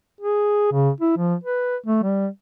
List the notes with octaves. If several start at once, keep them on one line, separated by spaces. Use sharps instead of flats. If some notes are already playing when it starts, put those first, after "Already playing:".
G#4
C#3
E4
F3
B4
A3
G3